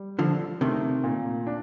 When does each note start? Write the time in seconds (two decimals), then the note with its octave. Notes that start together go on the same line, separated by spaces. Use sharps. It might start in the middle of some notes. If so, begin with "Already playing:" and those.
Already playing: G3
0.19 D3 F3 A4
0.61 C3 D#3 A3
1.04 A#2
1.47 D4